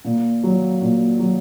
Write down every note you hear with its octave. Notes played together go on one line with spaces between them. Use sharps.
A#2
F#3
A#2
F#3